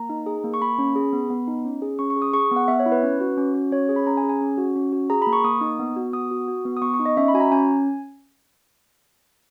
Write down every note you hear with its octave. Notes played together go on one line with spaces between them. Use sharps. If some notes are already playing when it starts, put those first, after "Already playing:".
Already playing: A#3 A#5
D#4
G#4
A#3
C#6
A#3 B5
C#4
G#4
B3
B3
D#4
C#4
G#4
C#4 C#6
C#6
G#4
D#6
G#4 C#6
B3
F#5
B3 E5
C#5
E4
B4
C#4
F#4
C#4
F#4
C#4 C#5
G#4
B5
C#4 A#5
G#5
G#4
G#5
C#4
F#4
C#4
F#4
G#4 A#5
B5
A#3
C#6
A#3 D#6
D#4
B3
F#4
B3 D#6
F#4
F#4
B3
D#6
B3 C#6
C#6
D#4
D#5
C#4 E5
B5
F#4 G#5
A#5
C#4 G#5